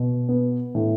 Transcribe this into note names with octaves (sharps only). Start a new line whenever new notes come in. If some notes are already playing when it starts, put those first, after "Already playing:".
Already playing: B2
B3
A2